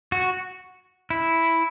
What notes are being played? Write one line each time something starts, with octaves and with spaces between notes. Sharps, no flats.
F#4
E4